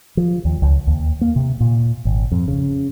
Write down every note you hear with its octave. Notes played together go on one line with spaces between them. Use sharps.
F3
D#2
C#2
D#2
A#3
C3
A#2
G#1
F2
C#3